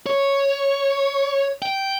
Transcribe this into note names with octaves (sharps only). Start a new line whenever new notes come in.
C#5
G5